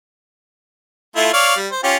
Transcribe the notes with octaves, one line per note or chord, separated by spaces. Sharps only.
A3 E4 F4
C#5 D5 F5
G3
C5
C#4 F4 G4